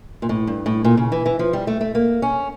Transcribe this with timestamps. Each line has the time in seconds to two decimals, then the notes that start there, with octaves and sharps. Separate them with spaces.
0.22 A#2
0.29 A2
0.47 G2
0.66 A2
0.84 A#2
0.97 C#3
1.12 E3
1.26 E3
1.39 F3
1.53 G3
1.67 A3
1.81 A3
1.95 A#3
2.22 C#4